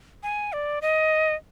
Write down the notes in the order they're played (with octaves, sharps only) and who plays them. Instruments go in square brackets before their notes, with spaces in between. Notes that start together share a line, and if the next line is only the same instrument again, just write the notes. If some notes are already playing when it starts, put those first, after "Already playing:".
[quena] G#5
D5
D#5